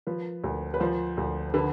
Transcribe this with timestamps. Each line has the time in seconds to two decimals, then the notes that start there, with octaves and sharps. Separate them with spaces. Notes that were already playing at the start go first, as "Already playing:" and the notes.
0.07 F3 B4
0.44 D2
0.74 B4
0.80 F3 C5
1.17 D2
1.54 D3 B4